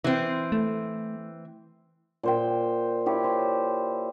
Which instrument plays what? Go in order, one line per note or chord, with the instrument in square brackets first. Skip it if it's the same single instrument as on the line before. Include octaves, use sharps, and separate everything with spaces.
[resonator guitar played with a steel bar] E3 C4
[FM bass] A3
[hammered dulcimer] A#2 C5 G5
E4 G4 C#5
C5